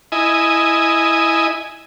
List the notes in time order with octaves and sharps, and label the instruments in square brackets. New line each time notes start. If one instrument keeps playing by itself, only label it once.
[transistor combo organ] E4 D#5 G#5